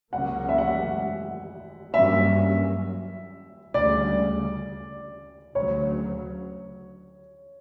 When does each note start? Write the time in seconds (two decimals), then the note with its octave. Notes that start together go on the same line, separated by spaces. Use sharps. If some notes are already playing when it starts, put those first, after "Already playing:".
0.13 C#2 C#3 F#3 A#3 C#4 F#5
0.49 E5
0.58 F#5
1.94 G2 F#3 A#3 C#4 E5
3.74 D2 C#3 G3 D5
5.55 D2 C#3 F#3 C#5